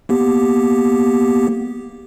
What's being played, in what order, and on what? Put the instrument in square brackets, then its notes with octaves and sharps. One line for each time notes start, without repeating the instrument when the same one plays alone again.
[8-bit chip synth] A#3 B3 G4